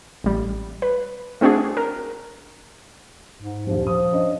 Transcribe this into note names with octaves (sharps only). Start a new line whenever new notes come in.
A1 G3
B4
A3 C4 D4 F#4 G#4
A#4
G#2
D#1 G2 F3
F3 D#6
C#4 D4 D#5